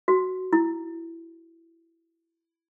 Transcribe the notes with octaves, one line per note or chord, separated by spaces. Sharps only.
F#4
E4